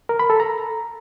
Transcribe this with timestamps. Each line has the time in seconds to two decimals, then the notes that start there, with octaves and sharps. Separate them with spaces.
0.09 A#4
0.19 B5
0.30 A4
0.40 A#5